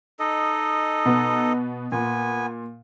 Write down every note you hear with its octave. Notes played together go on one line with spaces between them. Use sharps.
D#4 A4 D#5
B2 B3
A#2 B3 G#5